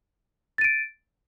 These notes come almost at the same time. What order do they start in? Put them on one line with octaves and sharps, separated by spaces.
A6 D#7 D7